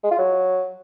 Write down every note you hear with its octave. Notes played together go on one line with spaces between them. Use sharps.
G#3
F4
F#3